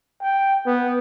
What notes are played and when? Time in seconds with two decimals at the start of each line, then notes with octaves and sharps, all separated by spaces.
0.21 G5
0.66 B3